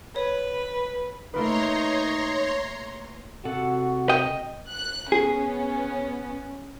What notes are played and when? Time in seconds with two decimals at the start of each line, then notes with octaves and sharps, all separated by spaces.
0.16 B4 C#5
1.34 A3 A#3 D#4 B4 C#5 A#5 C6
3.45 C3 F#4 A4 F#5
4.09 D#5 G5
4.70 F#6
5.12 B3 C#4 G#4